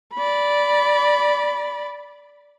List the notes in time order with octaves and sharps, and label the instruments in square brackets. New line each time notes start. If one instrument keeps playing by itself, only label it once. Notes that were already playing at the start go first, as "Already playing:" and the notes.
[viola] D5 B5